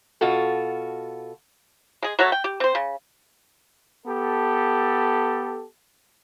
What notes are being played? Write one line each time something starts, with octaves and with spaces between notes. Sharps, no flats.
B2 F4 F#4 A4
G#3 G#4
F#3 A3 F#4 C#5
G5
G4
C4 C5
C#3
B3 G4 A4